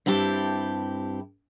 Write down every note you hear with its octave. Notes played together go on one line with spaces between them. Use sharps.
G2 C4 E4 G4 A5